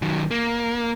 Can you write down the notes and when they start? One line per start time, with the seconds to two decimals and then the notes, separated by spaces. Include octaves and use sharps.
0.02 D#3 F#3
0.31 A#3